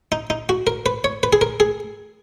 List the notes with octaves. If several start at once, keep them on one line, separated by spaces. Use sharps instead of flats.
D#4
D#4
F#4
A#4
B4
C#5
B4
G#4
A#4
G#4